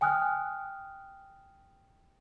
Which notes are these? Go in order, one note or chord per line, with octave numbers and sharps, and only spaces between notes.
G5 G#5 D#6 F6 F#6